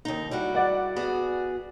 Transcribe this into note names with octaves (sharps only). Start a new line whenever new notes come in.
D#2 D#4
G3 E4 F#4
D5 F#5
B3 F#4 G#4